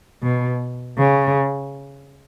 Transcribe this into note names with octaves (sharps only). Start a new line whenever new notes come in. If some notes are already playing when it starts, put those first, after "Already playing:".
B2
C#3